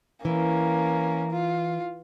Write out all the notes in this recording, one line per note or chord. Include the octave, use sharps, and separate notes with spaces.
E3 A#3 C#4
F4